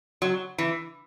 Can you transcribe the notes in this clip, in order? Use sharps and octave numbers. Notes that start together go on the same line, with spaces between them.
F#3
E3